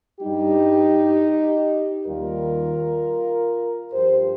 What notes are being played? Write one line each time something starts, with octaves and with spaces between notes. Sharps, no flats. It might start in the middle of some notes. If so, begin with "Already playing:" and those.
G2 G3 D#4 G4
D#2 D#3 G3 F4 A#4
G2 F3 G4 C5